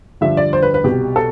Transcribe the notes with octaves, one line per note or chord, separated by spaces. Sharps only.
G2 D3 F3 E5
D5
C5
B4
B4
C2 B2 G4
A4